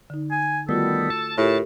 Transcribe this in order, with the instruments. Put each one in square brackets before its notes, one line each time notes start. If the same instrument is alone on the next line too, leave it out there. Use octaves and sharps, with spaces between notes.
[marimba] D3 D#4
[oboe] G#5
[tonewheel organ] D#3 G3 B3 [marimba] A3 F4 F#4 [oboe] A4
[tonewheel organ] A5
[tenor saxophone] A2 [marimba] F4 G4 A#4